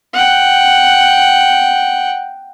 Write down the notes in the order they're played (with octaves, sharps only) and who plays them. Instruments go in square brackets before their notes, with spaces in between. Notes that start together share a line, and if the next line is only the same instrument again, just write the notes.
[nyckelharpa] F#5 G5